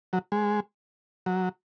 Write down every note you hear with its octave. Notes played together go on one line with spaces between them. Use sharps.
F#3
G#3
F#3